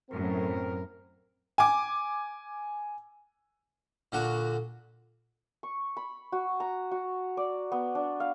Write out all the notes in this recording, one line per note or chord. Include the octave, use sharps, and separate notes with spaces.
F#2 A2 C4 A#4
G#5 D6
A#2 D3 F#4
C#6
B5
F#4
A#5
F#4
D5
B3
D4
F5